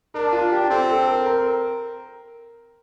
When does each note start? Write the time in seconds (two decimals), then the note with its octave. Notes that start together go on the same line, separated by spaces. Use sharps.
0.14 D4 A#4
0.33 F4
0.52 G4
0.70 C4 A4
0.89 A4
1.07 A#4
1.26 A#4